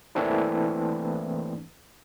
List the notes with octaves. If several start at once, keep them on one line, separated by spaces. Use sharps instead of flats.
E3 A3 A#3 C4 D4 E4